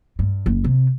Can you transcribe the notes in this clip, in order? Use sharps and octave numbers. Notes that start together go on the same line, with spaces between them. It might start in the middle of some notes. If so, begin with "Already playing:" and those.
G2
F#1
C3